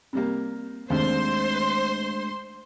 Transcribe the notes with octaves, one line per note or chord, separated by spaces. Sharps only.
C3 G3 A#3
D#2 C3 G#3 A3 D4 C5 C6